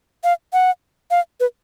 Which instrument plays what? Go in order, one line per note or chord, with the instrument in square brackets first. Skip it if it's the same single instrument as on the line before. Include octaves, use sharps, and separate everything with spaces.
[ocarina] F5
F#5
F5
B4